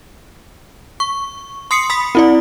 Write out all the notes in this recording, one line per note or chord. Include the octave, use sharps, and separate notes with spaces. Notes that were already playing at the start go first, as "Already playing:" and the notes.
C#6
C6 D#6 C7 C#7
B5 D#6 B6
C4 E4 D5